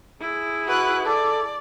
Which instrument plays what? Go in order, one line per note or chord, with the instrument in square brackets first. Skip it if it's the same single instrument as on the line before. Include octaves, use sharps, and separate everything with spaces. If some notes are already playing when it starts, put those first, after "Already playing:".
[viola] E4 G#4
[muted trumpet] F#4 [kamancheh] B4 F#6
[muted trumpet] A4 [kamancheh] D5